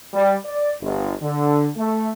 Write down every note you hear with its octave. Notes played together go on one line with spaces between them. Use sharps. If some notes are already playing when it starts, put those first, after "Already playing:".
G3
D5
G1
D3
A3